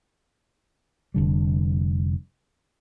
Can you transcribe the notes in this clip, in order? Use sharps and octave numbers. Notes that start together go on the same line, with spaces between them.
F1 D3 G3